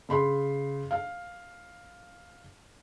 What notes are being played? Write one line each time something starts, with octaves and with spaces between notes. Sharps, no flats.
C#3 B5 C6
F5